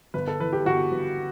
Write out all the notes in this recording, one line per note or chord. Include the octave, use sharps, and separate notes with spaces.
G1 B4
A4
E3 B4
G4
G1 F#4
G1